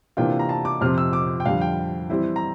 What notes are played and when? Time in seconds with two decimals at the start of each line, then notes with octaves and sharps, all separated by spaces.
0.17 C3 E3 A#3 D4 F4 G5
0.39 A#5
0.49 A5
0.65 D6
0.81 F2 C3 F3 C4 F6
0.98 E6
1.13 D6
1.40 G5
1.45 F2 D3 G3 F5
1.61 G5
2.10 E3 G3 C4 E4
2.36 A#5